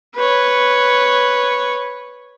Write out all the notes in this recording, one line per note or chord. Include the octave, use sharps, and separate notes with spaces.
B4 C#5